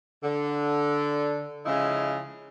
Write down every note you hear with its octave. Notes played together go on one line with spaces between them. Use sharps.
D3
C#3 F3 G#3 D#4 E4